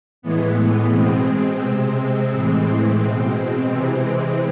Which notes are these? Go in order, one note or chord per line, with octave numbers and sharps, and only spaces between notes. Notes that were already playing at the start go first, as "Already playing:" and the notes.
A2 E3 G#3 B3
B2 G#3 C4
C3 G#3
A2 E3 G#3
B2 G#3
C3 E3 G#3 C4